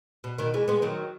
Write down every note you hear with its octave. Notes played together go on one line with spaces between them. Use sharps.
B2
B2 D#3
E3 G#3
G#3 B3
D#3 F#3